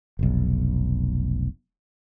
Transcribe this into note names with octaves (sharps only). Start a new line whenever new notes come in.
F1 B1